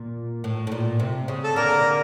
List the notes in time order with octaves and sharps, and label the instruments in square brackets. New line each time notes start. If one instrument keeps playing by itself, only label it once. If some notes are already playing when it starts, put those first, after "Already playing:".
Already playing: [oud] A#2
A2
A2
A#2
C3
C#3
[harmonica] A4
[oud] D3 [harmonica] A#3 A#4